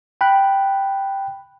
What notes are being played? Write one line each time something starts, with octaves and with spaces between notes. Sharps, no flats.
G5 B5 F#6